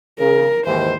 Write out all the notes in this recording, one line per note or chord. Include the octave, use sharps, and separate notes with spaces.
C#3 A#4
D#2 G#2 E3 C5